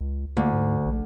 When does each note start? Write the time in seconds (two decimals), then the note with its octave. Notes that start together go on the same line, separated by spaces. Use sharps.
0.01 C#2
0.37 D2 A#3
0.53 G#2
0.86 A#1